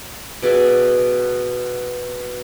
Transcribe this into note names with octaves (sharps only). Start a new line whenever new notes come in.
B2 G#4 D5 E5